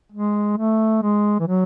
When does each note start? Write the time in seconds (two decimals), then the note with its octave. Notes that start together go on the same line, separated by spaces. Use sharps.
0.12 G#3
0.57 A3
1.03 G#3
1.40 E3
1.47 F#3